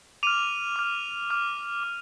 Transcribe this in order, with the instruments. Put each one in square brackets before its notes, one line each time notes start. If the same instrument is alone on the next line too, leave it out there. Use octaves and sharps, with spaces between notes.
[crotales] D6 F6 D#7 F7
D6 F6
D6 F6
D6